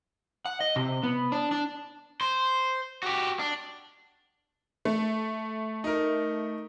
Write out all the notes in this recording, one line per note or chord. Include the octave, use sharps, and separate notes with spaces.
F#5
D#5
C3
B3
D4
D4
C5
F#4 G4
D4
A3
D#4 A#4